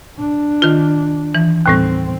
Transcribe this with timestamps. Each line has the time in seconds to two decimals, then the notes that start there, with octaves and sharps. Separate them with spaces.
0.18 D4
0.62 D#3 F4
1.35 E3
1.66 D#2 A2 G3 C4